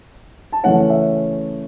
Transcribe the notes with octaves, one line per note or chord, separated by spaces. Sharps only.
A5
C#3 E3 A3 C#4 F#5
E5